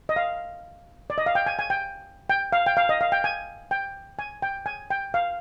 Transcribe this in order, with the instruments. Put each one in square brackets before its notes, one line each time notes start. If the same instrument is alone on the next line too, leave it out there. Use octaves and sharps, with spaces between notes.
[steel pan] D#5
F5
D5
D#5
F5
G5
G#5
G#5
G5
G5
F5
G5
F5
D#5
F5
G5
G#5
G5
G#5
G5
G#5
G5
F5